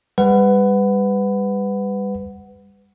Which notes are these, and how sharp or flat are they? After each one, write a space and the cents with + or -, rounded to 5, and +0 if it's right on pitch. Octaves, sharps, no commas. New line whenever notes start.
G3 +30 B4 +20 F#5 +0